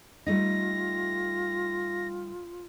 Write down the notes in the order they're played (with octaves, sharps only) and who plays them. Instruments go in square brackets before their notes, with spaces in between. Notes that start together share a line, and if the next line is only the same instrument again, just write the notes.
[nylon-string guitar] G3 A3 D#4 [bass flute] F4 [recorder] A#6